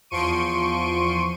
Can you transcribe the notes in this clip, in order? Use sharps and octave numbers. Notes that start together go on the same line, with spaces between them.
E2 F3 C6 C#6 D7 D#7